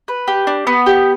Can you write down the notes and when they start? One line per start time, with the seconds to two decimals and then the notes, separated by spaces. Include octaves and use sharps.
0.08 B4
0.28 G4
0.47 D4
0.67 B3
0.86 G4